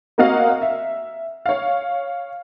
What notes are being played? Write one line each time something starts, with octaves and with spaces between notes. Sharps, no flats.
A#3 C4 F#4 D#5 F5 F#5
E5
C#5 F5